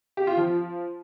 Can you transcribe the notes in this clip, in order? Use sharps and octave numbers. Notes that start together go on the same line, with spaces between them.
G4
F4
F3